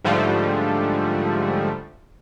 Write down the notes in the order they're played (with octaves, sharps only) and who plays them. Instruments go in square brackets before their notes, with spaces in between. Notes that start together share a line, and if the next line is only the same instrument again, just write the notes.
[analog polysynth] G#2 D3 F3 G3 A3